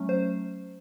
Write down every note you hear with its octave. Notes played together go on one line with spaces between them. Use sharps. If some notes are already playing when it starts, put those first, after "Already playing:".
Already playing: F#3 A3 C#4
C5